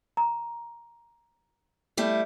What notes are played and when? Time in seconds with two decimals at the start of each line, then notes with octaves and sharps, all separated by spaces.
0.17 A#5
1.97 G3 A3 E4